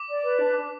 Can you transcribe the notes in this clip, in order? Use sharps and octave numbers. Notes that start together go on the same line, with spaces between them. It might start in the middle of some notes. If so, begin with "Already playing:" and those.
Already playing: D6
D5
B4
D4
D4